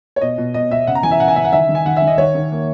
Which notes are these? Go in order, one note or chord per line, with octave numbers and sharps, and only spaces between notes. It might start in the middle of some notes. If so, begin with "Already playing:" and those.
C#5
B2 D#5
B2
B2 D#5
B2 E5
C#3 F#5
A#5
E3 G#5
E5
C#3 F#5
G#5
C#3 E5
F#5
D#3 E5
D#3
G#5
D#3 F#5
E5
D#3
D#5
D#3 C#5
D#3
A#3